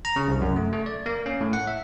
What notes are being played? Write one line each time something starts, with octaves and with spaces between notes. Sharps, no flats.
A#5
C#3
C2
F#2
A3
A3
D5
A#3
C#4
A2
F#5
E5